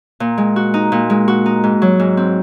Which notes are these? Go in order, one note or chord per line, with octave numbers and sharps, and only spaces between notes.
A#2
G#3
F#4
D#4
A#2
G#3
F#4
D#4
G#2
F#3
G#2
C4